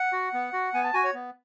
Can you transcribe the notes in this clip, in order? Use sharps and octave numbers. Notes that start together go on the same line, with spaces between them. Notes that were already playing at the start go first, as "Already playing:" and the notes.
Already playing: F#5
F#4
B3
F#4
B3 G#5
A5
F#4 G#5
C#5
B3